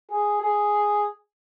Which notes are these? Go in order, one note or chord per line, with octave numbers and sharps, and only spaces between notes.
G#4
G#4